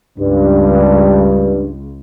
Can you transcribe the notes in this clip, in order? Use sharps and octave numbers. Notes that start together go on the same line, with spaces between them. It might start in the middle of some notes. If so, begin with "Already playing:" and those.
C#2 G2